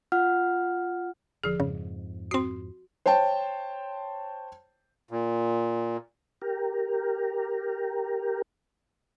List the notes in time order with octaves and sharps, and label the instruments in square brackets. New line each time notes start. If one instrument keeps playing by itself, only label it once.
[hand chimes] F4 F#5 F6
[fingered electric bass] E1 D3 [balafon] F3 G#4
[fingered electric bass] F2 G#2 [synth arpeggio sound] C#3
[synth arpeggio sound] C4 C7 [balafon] F#4 C6
[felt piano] C5 C#5 G5 A5
[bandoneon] A#2
[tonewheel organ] G4 A#4